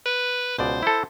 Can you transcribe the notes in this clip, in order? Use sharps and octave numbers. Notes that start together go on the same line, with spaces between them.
B4
C#2 B2 C5 D5
E4 A4